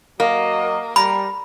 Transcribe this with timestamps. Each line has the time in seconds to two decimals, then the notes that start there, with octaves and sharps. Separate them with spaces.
0.20 F#3 A#3 F#4 D#5
0.96 G3 A#4 B5